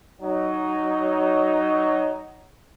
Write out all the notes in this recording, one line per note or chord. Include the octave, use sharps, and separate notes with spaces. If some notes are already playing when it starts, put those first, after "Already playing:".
F#3 D#4